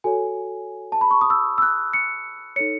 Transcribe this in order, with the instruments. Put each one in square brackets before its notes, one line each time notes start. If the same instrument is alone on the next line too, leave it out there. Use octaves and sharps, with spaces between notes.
[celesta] F#4 A4 C#5 G#5
A5
B5
C#6
D#6
E6
E6
F#6
C#7
D#4 A4 C#5 C#7